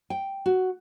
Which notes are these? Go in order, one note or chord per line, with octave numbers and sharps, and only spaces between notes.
G5
F#4